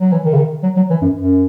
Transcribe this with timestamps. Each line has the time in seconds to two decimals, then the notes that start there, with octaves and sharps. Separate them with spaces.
0.01 F#3
0.12 E3
0.25 D#3
0.33 C#3
0.37 D#3
0.63 F#3
0.76 F#3
0.90 E3
1.02 F#2
1.15 F#2